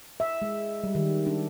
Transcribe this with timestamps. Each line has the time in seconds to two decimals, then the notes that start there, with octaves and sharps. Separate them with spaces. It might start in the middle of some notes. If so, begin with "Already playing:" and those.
0.20 E5
0.42 G#3
0.84 G3
0.95 D#3
1.26 D4